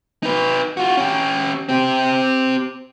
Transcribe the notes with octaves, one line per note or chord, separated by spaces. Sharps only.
D#4 B4
F4 F#4
C#4 G4
C4 G4